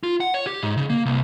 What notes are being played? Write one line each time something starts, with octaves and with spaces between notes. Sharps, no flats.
F4
F#5
C#5
G4
G#2
C#3
A#3
C2